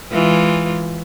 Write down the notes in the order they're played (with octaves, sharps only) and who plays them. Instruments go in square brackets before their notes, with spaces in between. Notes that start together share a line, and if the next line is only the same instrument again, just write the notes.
[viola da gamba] E3 G#3 F4